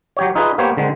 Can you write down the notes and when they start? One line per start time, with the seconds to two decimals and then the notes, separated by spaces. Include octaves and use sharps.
0.17 F#3 G4 C#5
0.35 D#4 F4 G#4 B4 E5
0.58 A#3 B3 G4 C5 C#5
0.77 D3 D#3 G#3 C4